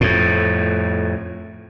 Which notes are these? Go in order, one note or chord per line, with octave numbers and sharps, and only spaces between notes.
F2 A2